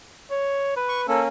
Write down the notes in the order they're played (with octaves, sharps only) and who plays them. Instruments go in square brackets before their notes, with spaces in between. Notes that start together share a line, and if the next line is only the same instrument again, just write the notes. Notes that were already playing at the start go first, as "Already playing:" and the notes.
[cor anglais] C#5
B4
[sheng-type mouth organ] C#6
[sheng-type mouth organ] A#3 C#4 [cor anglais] A4